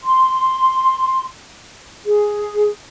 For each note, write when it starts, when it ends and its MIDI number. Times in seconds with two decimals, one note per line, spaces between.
0.01 1.25 84
2.05 2.70 68